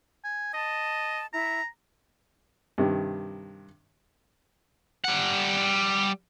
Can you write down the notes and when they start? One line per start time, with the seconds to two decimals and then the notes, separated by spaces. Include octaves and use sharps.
0.25 G#5
0.54 D#5 A5
1.33 E4 A#5
2.78 G2 C3 D#3
5.04 G3 F#5